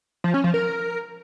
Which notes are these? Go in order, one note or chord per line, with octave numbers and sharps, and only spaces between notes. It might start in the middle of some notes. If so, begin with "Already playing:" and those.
F3
C#4
F3
A#4